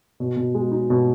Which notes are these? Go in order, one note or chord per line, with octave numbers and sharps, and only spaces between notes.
B2
B2
G#3
D#4
B2